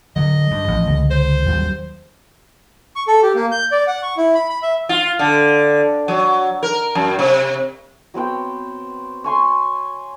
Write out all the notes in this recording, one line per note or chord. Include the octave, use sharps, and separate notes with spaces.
D3 F#3 D#5
G2
A1 F3
C#2 D3
C5
D#2 F#3 G3
C#6
A4
G4
A#3
G6
D5
F#5
C#6
E4
B5
B5
E5
F4
D3
F#3
A#4
F#2
C3
F#3 B3 C4 G5
C#5 G#5 C6